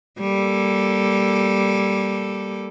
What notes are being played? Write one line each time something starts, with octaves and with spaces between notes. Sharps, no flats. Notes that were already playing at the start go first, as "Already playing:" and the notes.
G3 A#3 A4